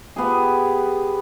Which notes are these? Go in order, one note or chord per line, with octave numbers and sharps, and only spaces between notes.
B3 G4 G#4